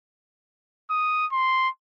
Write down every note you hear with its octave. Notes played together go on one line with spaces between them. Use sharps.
D#6
C6